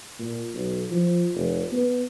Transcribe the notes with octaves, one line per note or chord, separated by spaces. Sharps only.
A#2
B1
F3
F1
B3